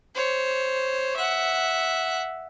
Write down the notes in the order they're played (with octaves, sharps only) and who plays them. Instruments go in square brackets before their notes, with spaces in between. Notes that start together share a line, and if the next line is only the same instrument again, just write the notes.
[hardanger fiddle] C5 C#5
E5 F#5